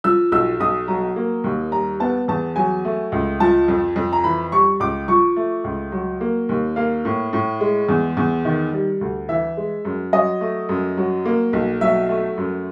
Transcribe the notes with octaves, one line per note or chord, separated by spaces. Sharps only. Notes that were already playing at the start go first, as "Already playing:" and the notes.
F3 E6
B1 E6
B1 D#6
F#3 A#5
A#3
D#2
G3 A#5
B3 A5
E2 A5
F#3 G#5
A3
C#2
F3 A5
F2
F2
A#5
E3 B5
G3 C#6
C#2 D6
F3 C#6
A3
C#2
F#3
A#3
D#2
A#3 F5
A2
A2
G#3
E2
E2
D#3
G3
D2
E3 E5
G#3
F#2
F#3 D#5
A3
F#2
F#3
A#3
B1
F#3 E5
A3
F#2